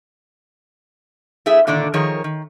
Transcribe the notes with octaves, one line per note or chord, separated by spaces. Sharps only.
A3 E4 G#4 E5
A#2 D3 D#3 D4
D#3 F3 G#4 A#4 C#5
D#3